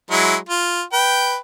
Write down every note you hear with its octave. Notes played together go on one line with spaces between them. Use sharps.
F#3 G#3 E4
F4
B4 G5